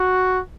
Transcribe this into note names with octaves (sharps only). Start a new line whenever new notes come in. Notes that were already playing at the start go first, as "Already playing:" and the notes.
Already playing: F#4